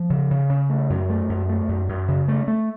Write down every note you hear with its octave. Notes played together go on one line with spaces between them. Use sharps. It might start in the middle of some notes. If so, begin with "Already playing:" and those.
Already playing: F3
C#3
C#3
C#3
A3
F#2
A3
F#2
A3
F#2
F#2
C#3
A3
A3